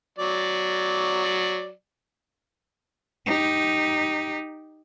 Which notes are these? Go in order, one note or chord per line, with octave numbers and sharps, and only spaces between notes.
F#3 D5
D#4 G4